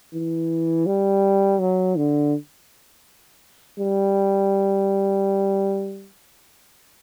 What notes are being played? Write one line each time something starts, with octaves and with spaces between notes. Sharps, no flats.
E3
G3
F#3
D3
G3